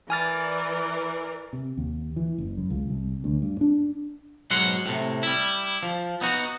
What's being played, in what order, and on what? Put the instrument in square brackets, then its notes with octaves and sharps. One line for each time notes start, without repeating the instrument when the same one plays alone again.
[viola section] E3 A#4 D5 [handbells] G#5 F6 A6
[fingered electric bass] C3
D#2
E3
F#1
F#2
C#2
C2
D2
G2
D4
[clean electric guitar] G#2 B2 F#3 F#5 C6
A2 C3
G3 E4
F3
B3 D#4 F#4